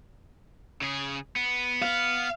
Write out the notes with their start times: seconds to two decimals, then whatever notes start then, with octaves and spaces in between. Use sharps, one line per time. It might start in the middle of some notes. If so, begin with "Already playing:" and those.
0.81 C#3 G#4
1.36 B3
1.82 F5